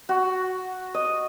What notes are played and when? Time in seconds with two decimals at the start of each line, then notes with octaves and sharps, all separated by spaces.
0.09 F#4
0.94 D#5